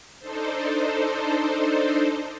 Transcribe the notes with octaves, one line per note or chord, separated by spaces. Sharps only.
D4 D#4 A4 C5